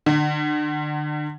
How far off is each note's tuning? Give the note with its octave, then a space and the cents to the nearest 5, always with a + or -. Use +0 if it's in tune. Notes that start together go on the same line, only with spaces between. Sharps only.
D3 +35